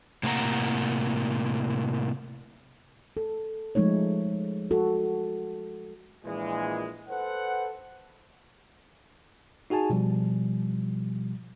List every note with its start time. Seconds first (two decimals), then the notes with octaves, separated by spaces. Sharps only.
0.23 A2 C3 A#3 A#4 F#5 A#5
3.17 A4
3.75 F3 G#3 A3 D#4 C#5
4.71 F#4 A4
6.25 A#1 A#2 E3 G#3
7.08 A4 B4 C5 F#5
9.70 D#4 F#4 G#4 G#5 A5
9.90 B2 F3 G3